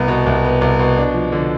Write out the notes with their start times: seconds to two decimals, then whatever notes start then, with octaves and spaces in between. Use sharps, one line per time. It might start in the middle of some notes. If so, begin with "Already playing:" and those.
Already playing: C2 B3
0.08 B2
0.26 C2
0.44 B3
0.61 C2
0.79 B2
0.97 D4
1.14 F3
1.32 D3